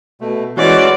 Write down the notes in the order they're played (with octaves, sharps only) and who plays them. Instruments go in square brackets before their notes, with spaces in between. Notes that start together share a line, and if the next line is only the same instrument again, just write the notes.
[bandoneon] B2 A3
[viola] E3 D5 [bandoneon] G#3 C#4 F#4